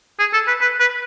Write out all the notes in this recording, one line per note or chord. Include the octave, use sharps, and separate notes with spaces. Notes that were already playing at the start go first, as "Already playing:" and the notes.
G#4
A4
B4
B4
B4